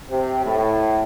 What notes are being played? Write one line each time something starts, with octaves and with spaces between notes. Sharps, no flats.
C3 C4 G4
A2